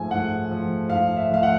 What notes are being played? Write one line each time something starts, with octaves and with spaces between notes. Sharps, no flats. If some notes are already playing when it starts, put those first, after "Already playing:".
Already playing: G#2 F3 A3 G#5
G#2 F#5
F3 A3
G#2 F5
E5
F3 A3 F5
F#5